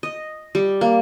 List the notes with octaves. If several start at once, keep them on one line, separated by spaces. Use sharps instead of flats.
D#5
G3
A#3